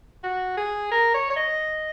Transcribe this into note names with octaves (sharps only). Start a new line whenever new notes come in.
F#4
G#4
A#4
C#5
C#5
D#5